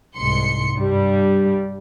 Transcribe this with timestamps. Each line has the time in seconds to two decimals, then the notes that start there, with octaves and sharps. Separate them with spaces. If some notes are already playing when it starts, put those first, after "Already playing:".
0.16 C2 G#2 C6 C#7
0.78 G2 G3